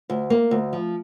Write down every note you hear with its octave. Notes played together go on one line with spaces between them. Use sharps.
D2
A#3
D2
F3